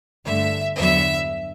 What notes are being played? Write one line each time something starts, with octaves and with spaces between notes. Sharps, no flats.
G1 G2 D3 A3 E5
E2 D3 F#3 B3 E5